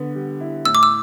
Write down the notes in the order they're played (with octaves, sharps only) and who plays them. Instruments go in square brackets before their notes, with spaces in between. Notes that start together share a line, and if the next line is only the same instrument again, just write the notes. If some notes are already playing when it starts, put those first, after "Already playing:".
Already playing: [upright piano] D3 B3
G3
E4
[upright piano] A2 [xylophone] E6
[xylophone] D6
E6